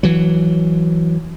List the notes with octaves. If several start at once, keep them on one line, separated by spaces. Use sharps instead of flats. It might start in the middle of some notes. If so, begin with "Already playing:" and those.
E3 F#3